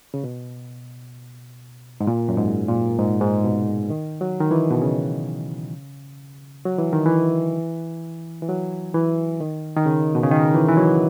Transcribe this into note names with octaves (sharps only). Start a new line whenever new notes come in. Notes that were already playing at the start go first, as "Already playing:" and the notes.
C#3
B2
G#2
A#2
F#2
G#2
A#2
G#2
G#2
B2
D#3
F#3
D#3
E3
B2
C#3
F#3
E3
D#3
E3
E3
F#3
E3
D#3
D#3
C#3
B2
C#3
D#3
E3
E3
F#3